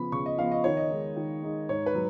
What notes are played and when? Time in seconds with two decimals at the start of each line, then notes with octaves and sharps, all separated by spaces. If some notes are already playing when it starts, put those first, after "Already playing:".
Already playing: C#3 F3 B3 B5
0.12 C#3 C#6
0.26 D#5
0.38 F3 B3 F5
0.51 D#5
0.64 D#3 C#5
0.77 D#5
0.90 G#3 D#4
1.16 D#3
1.43 G#3 D#4
1.69 G#2 C#5
1.86 B4
1.95 F#3